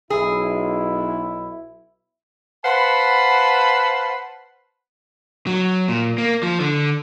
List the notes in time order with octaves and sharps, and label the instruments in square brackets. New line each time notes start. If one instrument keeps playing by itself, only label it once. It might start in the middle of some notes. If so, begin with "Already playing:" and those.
[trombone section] B1 E4 [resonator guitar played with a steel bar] G#4
[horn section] B4 C5 F5 F#5 A5 B5
[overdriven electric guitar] F#3
A#2
A#3
F3
D3